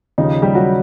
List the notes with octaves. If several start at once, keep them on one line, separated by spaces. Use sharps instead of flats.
D#2 C#3 F3 D#4
G3 G4
F#3 F#4